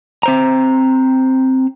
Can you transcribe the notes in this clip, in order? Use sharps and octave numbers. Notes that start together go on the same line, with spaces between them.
C4 C5 A#5